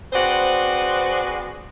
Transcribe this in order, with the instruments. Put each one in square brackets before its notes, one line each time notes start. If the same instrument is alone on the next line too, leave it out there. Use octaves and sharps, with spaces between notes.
[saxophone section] C4 F#4 G#4 B4 C5 D5